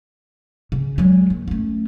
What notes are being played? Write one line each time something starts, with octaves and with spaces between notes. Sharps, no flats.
C#3
F#3 G#3
D#2
A3 C#4